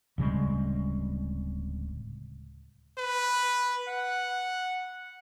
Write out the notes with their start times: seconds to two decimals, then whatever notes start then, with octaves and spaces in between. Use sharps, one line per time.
0.18 D1 C#3 G3 G#3
2.98 B4
3.88 F#5